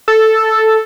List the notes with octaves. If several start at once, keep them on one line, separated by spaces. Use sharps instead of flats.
A4